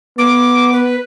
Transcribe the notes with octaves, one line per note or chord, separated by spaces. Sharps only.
B3 D6
B4